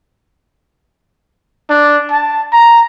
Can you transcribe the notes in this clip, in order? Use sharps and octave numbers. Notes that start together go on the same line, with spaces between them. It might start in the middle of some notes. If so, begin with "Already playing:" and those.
D4
A5
A#5